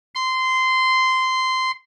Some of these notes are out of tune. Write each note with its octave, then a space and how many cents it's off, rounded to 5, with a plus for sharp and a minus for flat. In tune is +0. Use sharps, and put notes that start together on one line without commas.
C6 -15